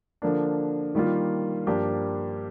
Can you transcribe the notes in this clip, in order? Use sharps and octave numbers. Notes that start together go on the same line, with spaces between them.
D3 F3 A#3 D4
D#3 G3 A#3 F4
G2 F3 A#3 D4 G4